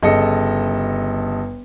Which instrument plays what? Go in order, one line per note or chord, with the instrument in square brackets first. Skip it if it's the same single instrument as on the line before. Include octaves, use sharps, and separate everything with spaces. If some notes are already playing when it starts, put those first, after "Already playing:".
[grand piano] G1 C#3 A4 D#5 C#7